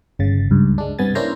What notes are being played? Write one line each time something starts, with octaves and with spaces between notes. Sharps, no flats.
G1 C#3 A6
C#2 G2
G#3 D4
G2 C3 B3 G#5 A6
A#3 C#4 D4 E4 C5 A#5